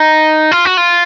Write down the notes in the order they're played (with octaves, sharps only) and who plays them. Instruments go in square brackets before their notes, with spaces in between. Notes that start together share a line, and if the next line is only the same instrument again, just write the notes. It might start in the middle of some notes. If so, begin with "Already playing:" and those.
Already playing: [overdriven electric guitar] D#4
F4
F#4
F4